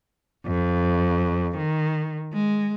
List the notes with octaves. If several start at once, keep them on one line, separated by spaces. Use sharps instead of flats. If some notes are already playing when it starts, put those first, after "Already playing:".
F2
D#3
G#3